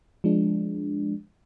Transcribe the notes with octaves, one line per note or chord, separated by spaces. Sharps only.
F3 G#3 D4